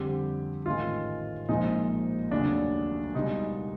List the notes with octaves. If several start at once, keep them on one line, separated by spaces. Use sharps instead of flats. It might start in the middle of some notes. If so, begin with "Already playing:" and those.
Already playing: F2 D3 G3 G4
A1 G#2 D#3 G#3 F4
A#1 A#2 F3 G#3 D#4
F1 D#2 C#3 F#3 D4
C#2 B2 G3 D#4